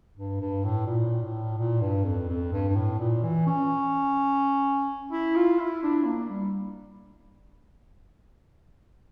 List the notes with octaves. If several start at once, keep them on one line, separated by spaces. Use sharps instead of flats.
G2
G2
A2
A#2
A2
A#2
G2
F2
F2
G2
G2
A2
A#2
E3
C#4
E4
F4
E4
D4
A#3
G3